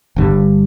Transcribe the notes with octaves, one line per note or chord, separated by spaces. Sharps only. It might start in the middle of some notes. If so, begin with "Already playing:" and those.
G1 G2 D3 G3